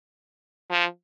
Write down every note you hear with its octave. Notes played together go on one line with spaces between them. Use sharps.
F3